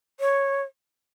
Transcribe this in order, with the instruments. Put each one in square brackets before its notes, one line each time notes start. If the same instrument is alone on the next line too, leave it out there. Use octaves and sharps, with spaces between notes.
[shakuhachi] C#5